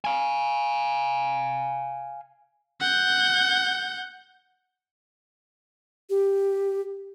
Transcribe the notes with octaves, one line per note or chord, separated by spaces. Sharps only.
F5 G#5
F#5 G6
G4